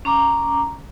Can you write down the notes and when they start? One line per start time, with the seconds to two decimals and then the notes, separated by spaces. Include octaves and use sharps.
0.05 C#4 A#5 D6